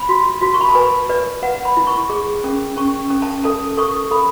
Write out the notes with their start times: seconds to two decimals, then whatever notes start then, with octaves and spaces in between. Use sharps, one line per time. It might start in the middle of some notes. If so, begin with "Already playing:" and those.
Already playing: B5
0.09 F#4
0.41 F#4
0.54 C#6
0.61 B5
0.69 A5
0.75 B4 G#5
1.09 B4 D5
1.42 B4 F#5
1.65 B5
1.77 E4
1.87 C#6
2.10 G#4
2.44 C#4
2.76 C#4 C#6
3.10 C#4
3.22 A5
3.44 A4 A5
3.77 A4 C#6
4.11 A4 B5